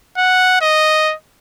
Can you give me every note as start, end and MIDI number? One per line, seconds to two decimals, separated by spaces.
0.17 0.59 78
0.61 1.14 75